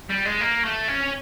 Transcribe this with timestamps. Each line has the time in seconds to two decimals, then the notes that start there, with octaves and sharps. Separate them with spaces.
0.09 G3
0.25 G#3
0.41 A#3
0.64 A3
0.88 C#4